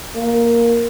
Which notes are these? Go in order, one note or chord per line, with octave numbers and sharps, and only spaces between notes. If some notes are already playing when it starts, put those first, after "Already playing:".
A#3